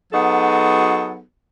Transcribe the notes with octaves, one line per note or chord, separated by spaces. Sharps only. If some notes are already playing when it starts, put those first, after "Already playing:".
F#3 B3 D#4 F#4 G#4 A4